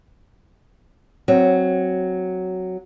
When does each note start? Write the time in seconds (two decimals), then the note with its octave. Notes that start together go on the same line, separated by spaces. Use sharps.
1.28 F#3 C4